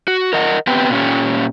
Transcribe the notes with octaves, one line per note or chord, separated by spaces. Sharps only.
F#4
A#4 D#5 F#5
B3 C4 G4 B4 G5
A#2 C#4 G4